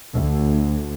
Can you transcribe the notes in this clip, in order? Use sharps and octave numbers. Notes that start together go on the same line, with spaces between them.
D2